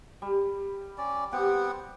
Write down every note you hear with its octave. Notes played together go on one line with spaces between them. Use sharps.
G3
C#4 D5
B3 C4 G4 F#5